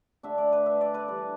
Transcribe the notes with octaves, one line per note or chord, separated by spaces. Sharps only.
D3 A3 D4 E5
D5
B4
E5
D5
B4
E3 G3 D4